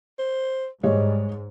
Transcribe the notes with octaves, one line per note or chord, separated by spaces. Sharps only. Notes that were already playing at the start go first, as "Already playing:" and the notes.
C5
G#2 G3 G#3 C#5 D#5